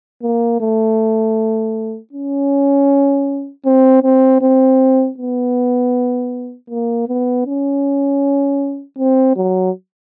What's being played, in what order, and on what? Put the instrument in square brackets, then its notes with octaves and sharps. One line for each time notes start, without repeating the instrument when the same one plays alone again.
[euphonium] A#3
A3
C#4
C4
C4
C4
B3
A#3
B3
C#4
C4
F#3